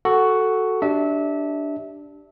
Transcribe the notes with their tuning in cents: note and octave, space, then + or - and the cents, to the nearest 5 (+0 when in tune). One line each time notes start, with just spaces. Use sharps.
F#4 +5 A4 +0
D4 +0 G4 -5 E5 -25